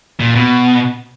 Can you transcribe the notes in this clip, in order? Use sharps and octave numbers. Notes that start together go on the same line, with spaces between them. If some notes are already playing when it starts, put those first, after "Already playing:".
A#2
B2